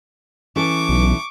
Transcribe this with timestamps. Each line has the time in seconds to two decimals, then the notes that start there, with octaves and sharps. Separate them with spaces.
0.56 E3 C#4 A4 C#6 D6
0.89 B1